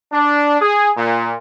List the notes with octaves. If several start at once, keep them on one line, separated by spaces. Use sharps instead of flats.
D4
G#4
A#2